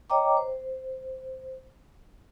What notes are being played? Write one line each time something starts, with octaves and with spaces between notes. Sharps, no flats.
C#5 D#5 G5 A#5 D6
C5